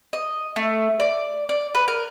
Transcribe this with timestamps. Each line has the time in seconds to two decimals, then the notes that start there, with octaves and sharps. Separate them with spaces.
0.13 D#5
0.56 A3
1.00 D5
1.49 D5
1.75 B4
1.88 A#4